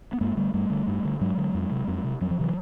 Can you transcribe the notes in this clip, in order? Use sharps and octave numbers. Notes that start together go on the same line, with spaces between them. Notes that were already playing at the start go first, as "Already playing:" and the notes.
B3
G2 G#3 A#3
D3 G3 A3
G2 G3 A3
D3
G2
D3
G2 F#3 G#3
D3
F2
C3
F2
C3
F2 F#3
F3
C3 E3 F#3